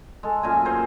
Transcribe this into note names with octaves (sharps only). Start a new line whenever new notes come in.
G#3 A4
F#2 A#2 E5 G#5
G#4 A#4 C5